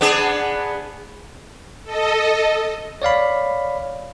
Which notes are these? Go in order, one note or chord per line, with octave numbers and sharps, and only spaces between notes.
B3 D4 G#4
A4 D#5
C#5 D5 F5 B5